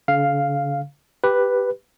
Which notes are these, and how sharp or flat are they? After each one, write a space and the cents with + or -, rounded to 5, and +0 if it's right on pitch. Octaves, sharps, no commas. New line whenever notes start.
D3 -45 F5 +0
G4 +0 B4 +0